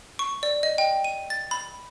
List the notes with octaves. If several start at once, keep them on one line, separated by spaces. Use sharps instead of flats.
C#6
D5
D#5
G5
D#7
A6
B5